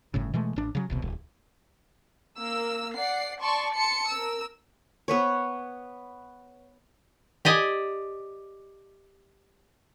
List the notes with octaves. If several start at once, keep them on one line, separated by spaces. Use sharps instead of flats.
G1 A2 C#3
B2 E3 G#3 A3
A1 D4
C#3 F#3
D#1 C2 B2
D1
A#3 E6
D5 F#5 C7
D5 A5 C6 C#6
A5 C6 C#7
A#4 E6
B3 B4 C#5
G4 D5 D#5 G#5